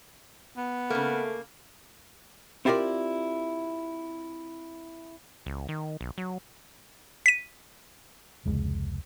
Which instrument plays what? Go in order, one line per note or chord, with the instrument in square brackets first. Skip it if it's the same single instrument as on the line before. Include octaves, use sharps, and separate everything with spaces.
[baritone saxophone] B3
[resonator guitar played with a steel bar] C#3 A#3 [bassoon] A3
[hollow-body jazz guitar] C4 E4 F4 G4 A#4 D5
[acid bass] C#2
D#3
B1
F#3
[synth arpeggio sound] B6 D#7
[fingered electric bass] F1 C#2 G#3